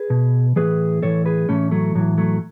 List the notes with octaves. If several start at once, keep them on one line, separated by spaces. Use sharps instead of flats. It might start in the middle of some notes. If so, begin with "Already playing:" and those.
Already playing: G#4 B4
B2
A2 E3 G#4 B4
A2 E3 A4 C#5
G#4 B4
A2 E3 A3 C#4
F#3 A3
A2 E3 F#3
F#3 A3